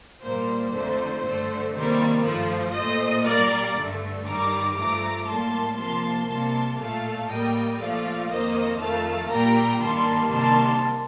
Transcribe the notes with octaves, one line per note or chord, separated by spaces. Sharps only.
A#2 G3 A#3 C5
F2 D3 A3 C5
G2 D3 A3
C3 D#3 G3 A#3 C5
G2 F3 A3 C5
A#2 A3 C5 D#5
A#2 G3 A#3 A#4 D5
G2 D3 A3
G2 D#3 G3 A#5 D6
G2 F3 A3 A#5 D6
A2 G3 A#3 A5 C6
C3 F3 A#3 A5 C6
C3 G3 A#3 A5 C6
A#2 A3 F5 A5
A2 G3 A#3 D#5 G5
A#2 F3 A3 D5 F5
F2 D#3 A#3 C5 D#5
F2 D#3 A3 F5 A5
A#2 G3 A#3 G5 A#5
G2 D#3 G3 A#3 A5 C6
C3 D#3 G3 A#3 A5 C6